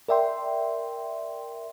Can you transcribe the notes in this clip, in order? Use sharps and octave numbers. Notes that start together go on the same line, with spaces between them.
A#4 D5 E5 G5 C6